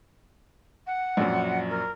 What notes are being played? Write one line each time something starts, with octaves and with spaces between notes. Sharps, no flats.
F#5
A#1 F#2
A#4